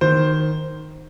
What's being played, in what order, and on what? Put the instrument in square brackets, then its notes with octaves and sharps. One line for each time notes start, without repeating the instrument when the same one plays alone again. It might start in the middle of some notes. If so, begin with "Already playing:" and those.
[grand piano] D#3 C5